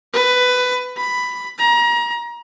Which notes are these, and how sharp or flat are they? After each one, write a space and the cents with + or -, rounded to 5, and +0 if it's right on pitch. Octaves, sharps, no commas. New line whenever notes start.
B4 +15
B5 +5
A#5 +30